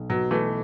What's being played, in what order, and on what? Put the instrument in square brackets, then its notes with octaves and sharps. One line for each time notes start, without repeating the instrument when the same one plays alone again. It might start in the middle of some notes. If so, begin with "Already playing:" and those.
Already playing: [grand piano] B1
[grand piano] B2 B3 F#4 [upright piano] F#3
[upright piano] E3 A3